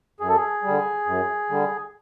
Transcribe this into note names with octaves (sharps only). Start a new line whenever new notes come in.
F#2 G#4
A4
G#4
G3
D3
F#2
D3 G3